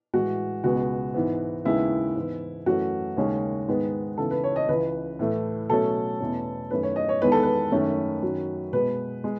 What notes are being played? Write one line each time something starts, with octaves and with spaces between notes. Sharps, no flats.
A2 E3 G#3 F#4
C#2 B2 G#3 B3 F#4
G#2 E3 B3
D#2 C#3 G#3 B3 E4
G#2 E3 B3
F#2 E3 A3 C#4 F#4
D#2 C#3 G#3 C#4
G#2 D#3 G#3 B3
D#2 C#3 E3 B3 A4
B4
C#5
D#5
C#2 C#3 E3 B4
A2 E3 A3
B2 F#3 A3 C#4 A4
E2 B2 A3 C#4
F#2 D#3 A3 C#4 B4
C#5
D#5
C#5
E2 D#3 G#3 B3 B4
A4
B4
F#2 D#3 A3 C#4
F#2 D#3 F#3 C#4
B2 G#3 B3 B4
G#3